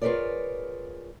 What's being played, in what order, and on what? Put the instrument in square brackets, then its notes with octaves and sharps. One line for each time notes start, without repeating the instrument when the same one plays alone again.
[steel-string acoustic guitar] F4 G#4 A#4 B4 C#5 D5